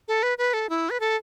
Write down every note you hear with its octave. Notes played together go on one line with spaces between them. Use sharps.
A4
B4
B4
A4
E4
B4
A4